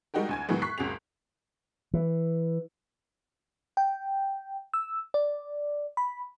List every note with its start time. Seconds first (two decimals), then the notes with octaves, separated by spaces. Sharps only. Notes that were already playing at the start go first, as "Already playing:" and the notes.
0.14 G3 G#3 D#4 F#4 G4 A#4
0.29 D2 G#5 G#6
0.49 A2 D#3 E3 F#3 G#3 B3
0.62 C#6 F#6 B6 C7
0.78 F#1 C#2 F#4 G#4 F7
1.94 E3
3.77 G5
4.74 E6
5.14 D5
5.97 B5